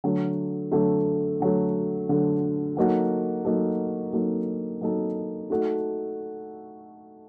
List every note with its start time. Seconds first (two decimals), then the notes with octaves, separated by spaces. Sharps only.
0.04 D3 F#3 A3
0.72 D3 F#3 A3
1.40 D3 F#3 A3
2.09 D3 F#3 A3
2.77 F#3 A#3 D#4 F#4 A4
3.45 F#3 A#3 D#4 F#4 A4
4.13 F#3 A#3 D#4 F#4 A4
4.81 F#3 A#3 D#4 F#4 A4
5.50 A3 D#4 F#4 A4